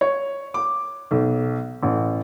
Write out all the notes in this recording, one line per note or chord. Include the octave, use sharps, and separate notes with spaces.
C#5
D6
B1
A1